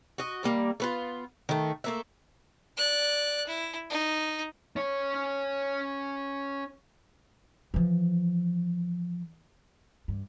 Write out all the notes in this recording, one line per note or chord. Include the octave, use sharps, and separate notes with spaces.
F#4 D#5
D#3 G3 A#3
A3 B3 F4
D#3 A3
A3 A#3 E5
D5 F#6
E4
D#4
C#4 C#5
E3 F3
G2